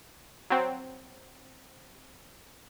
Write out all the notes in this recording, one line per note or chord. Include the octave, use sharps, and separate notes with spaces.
F#3 C4